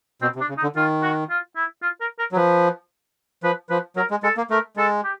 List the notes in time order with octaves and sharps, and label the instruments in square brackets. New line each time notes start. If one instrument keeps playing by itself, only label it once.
[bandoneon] B2 [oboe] C4
[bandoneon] C3
[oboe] D4
[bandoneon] C#3
[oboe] D#4
[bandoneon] D3
[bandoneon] D#3 [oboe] F4
[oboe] F#4
F4
E4
F4
A#4
A#4
[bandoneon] F#3
[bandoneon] F3 [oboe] B4
[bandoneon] F3 [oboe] B4
[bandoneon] F3 [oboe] B4
[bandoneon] F#3 [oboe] A#4
[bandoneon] G#3
[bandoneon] G#3 [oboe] A4
[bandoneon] A#3
[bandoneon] A3 [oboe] A#4
[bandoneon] G#3 [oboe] A4
[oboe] G4